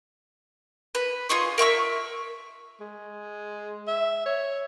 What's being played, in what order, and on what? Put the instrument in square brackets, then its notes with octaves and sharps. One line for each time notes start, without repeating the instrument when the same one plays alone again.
[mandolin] B4
F4 G#4 D#5 C#6
A#4 E5 C#6 E6
[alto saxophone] G#3
E5
C#5